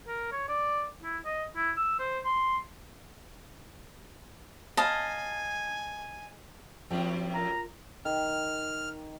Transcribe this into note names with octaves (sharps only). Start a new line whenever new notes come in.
A#4
C#5
D5
E4
D#5
E4
E6
C5
C6
D#5 F5 G#5 A5
F#2 A2 F3 G3 C4
F4 A#4 A#5
D#3 F6